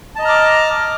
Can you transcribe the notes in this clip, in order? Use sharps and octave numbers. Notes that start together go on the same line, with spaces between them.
D#5 A5 A#5 D6 F6